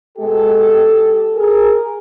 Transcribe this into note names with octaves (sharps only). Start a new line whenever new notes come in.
B2 G#3 G4 A4
G#4 A#4